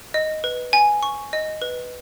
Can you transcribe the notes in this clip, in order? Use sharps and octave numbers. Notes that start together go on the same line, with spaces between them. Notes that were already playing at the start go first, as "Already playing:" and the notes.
D#5
B4
G#5
C#6
D#5
B4